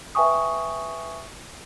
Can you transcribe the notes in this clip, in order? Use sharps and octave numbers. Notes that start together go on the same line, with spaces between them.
B4 E5 G5 G#5 C#6 D#6